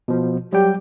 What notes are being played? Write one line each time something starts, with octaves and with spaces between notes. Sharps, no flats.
B2 F3
F#3 G3 G4 G5